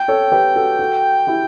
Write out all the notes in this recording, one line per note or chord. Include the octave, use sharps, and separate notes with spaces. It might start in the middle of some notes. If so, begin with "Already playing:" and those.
Already playing: G5
A4 C#5
G4 B4
F#4 A4
F#4 A4
E4 G4